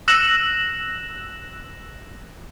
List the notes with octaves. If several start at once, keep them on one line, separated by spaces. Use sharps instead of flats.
E6 F#6 A#6 E7 F#7